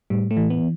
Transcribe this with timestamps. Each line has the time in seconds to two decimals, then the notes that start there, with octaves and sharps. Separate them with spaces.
0.10 A2 G3
0.31 A3
0.37 E3
0.50 B3